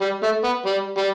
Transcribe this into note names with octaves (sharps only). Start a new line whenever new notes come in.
G3
A3
B3
G3
G3